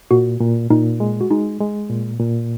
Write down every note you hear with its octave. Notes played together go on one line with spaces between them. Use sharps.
A#2 F#4
A#2
A#2 D#4
G#3
F#4
G#3 D#4
G#3
A#2
A#2